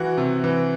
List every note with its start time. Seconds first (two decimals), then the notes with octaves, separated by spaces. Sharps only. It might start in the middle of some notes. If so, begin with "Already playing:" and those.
Already playing: E3 F#4
0.17 C3
0.44 E3